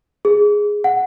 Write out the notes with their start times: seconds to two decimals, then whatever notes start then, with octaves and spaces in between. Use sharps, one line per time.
0.25 G#4
0.84 F#5